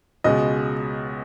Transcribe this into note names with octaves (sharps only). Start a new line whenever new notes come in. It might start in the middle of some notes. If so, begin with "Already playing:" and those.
C#2 B2 G#3 D#5